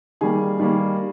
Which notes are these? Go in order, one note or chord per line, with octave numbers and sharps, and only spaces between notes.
D#3 G3 A#3 G#4
D#3 G3 A#3